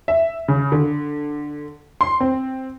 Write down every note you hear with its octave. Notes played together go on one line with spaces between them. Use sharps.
E5
C#3
D3
C6
C4